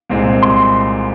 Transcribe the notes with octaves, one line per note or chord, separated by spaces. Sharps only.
C2 A#2 G#3 C4
C6